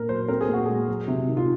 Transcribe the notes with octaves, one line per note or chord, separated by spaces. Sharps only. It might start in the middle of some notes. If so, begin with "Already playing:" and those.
Already playing: A#2 A#3 A#4
F#3 C5
C4 A#4
G#4
A#2
F#4
G#3 G#4
F#3
C3
D#3
F4